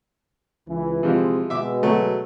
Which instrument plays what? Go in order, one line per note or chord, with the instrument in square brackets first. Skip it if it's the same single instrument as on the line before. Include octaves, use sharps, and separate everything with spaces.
[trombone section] C#2 E3
[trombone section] C3 G#3 [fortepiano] E3 F3
[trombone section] B2 G#3 [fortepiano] E5 D6
[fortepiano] F#3 A3